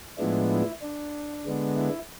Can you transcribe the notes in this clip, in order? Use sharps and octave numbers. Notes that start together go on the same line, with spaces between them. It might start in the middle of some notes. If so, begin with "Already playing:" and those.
A2 F3 G#3 B3 D4 E4
E4
D4
D3 G#3 B3 D4
E4